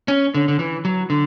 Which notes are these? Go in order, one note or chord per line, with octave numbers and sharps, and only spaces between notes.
C#4
D3
D3
E3
F#3
D3